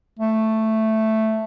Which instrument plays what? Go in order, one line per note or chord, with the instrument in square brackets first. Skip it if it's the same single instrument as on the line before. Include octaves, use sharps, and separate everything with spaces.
[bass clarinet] A3